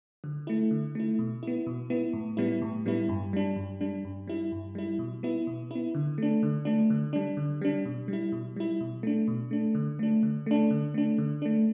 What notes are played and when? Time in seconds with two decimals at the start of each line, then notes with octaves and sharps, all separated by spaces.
0.24 D3
0.47 A3 E4
0.71 D3
0.95 A3 E4
1.19 B2
1.43 B3 E4
1.67 B2
1.90 B3 E4
2.13 A2
2.37 G3 B3 E4
2.62 A2
2.86 G3 B3 E4
3.09 G2
3.33 G3 D4
3.56 G2
3.81 G3 D4
4.05 G2
4.27 G3 E4
4.52 G2
4.75 G3 E4
4.99 B2
5.23 B3 E4
5.47 B2
5.71 B3 E4
5.95 D3
6.18 A3 D4
6.43 D3
6.65 A3 D4
6.90 D3
7.13 G3 D4
7.37 D3
7.62 G3 D4
7.85 B2
8.08 G3
8.13 E4
8.32 B2
8.56 G3 E4
8.81 B2
9.03 A3 D4
9.28 B2
9.51 A3 D4
9.75 D3
9.99 A3 D4
10.23 D3
10.46 A3 D4
10.70 D3
10.94 A3 D4
11.18 D3
11.42 A3 D4